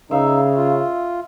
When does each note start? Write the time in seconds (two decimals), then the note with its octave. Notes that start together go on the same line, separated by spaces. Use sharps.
0.11 C#3 D#4 E5 F5
0.57 F4